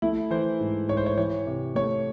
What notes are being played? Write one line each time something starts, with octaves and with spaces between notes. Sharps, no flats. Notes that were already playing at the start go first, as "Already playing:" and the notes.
A3 E4
E3 C5
G#2
G#2 C#5
C5
C#5
E3 C#5
C3
A3 C#5